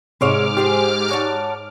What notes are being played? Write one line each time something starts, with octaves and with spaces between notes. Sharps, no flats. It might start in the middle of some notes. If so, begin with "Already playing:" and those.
G#2 C3 G#3 C#5 E5 D6 F6
F3 G4 G#4 C5
F#4 C#5 A5